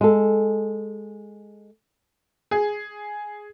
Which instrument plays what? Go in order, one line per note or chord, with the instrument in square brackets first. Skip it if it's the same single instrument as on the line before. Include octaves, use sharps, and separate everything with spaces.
[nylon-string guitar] G#3 A4
[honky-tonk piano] G#4